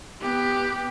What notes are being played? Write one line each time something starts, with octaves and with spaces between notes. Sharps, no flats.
B3 G4